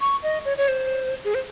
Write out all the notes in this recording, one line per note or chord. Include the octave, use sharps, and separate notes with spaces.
C#6
D#5
C#5
C#5
C5
G#4
C5